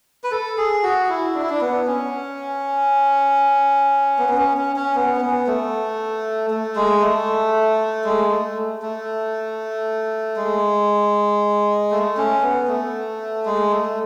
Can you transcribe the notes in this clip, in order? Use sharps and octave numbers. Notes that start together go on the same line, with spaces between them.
B4
A4
G#4
F#4
E4
D4
E4
D4
B3
C#4
B3
B3
C#4
C#4
C#4
B3
C#4
B3
A3
A3
G#3
A3
G#3
A3
A3
G#3
A3
C#4
B3
A3
G#3
A3